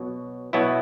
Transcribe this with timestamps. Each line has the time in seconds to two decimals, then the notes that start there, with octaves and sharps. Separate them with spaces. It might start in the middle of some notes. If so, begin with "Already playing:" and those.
Already playing: B2 F#3
0.53 B2 F#3 B3 E4